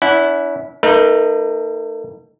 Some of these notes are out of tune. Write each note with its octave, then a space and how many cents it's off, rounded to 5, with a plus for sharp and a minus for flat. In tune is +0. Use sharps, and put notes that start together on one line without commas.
C#4 +45 E4 -15 F#5 +0
A3 +35 D#4 +0 B4 -45